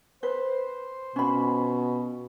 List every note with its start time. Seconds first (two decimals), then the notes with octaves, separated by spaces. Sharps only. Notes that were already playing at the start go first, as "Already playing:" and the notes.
0.23 B4 C5
1.16 B2 C#4 F4 B5